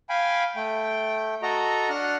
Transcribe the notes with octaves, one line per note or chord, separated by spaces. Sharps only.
F5 G5 G#5 B5
A3 G5
F#4 A4 D#5 A#5
D4 F#5 F6 F#6